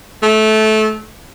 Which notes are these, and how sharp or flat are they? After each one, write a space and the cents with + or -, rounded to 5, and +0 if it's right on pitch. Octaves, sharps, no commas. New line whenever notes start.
A3 -20